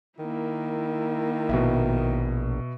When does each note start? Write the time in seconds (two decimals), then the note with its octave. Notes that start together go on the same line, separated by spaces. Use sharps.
0.19 D#3 A#3 E4
1.49 A#1 B2 E5